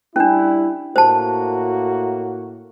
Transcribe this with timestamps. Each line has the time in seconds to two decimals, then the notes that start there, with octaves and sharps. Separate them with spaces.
0.16 G3 C#4 D4 E4
0.96 A2 A#3 F#4 C5 A5